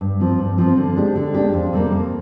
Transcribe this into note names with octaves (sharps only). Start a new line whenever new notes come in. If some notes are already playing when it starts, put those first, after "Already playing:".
G2
F3 C4
G2
F3 C4
D3
G#3 D4 G4
D3
G#3 D4 G4
F2
C3 G3 A#3
F2